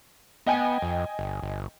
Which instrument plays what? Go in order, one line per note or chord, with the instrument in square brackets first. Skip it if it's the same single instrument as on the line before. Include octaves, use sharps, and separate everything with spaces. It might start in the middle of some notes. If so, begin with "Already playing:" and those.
[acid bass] B3 [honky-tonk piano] D#5 G5 G#5
[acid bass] F2
G1
G1